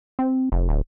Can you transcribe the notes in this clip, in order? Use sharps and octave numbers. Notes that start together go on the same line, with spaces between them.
C4
F1
D1